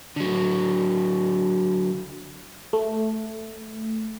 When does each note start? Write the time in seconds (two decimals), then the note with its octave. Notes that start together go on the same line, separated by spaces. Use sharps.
0.16 D3 F#3
2.73 A3